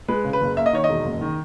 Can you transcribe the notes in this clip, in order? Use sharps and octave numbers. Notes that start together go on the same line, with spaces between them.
G#3 B4
C#3
B4
F#1
A#3 E5
D#5
D#3 C#5
D#5
E1
F#1
D#3